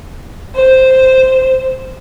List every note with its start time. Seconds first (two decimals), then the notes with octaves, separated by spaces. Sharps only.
0.54 C5